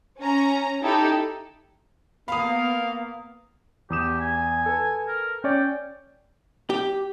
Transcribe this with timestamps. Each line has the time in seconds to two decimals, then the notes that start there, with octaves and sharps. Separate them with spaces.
0.19 C#4 A#5
0.81 D#4 E4 G4 A4
2.28 A#3 B3 F5 B5 D#6
3.90 E2 G4 D#6 E7
4.20 G#5
4.66 A4 B4
5.08 A#4
5.44 C#4 C#5 D5 G5
6.70 G4